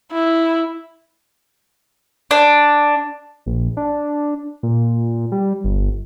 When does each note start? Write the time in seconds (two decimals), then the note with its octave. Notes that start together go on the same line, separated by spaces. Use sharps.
0.12 E4
2.31 D4
3.46 A#1
3.77 D4
4.63 A#2
5.32 G3
5.64 G1